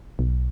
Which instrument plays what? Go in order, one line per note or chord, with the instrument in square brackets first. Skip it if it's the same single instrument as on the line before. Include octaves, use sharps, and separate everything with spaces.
[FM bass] B1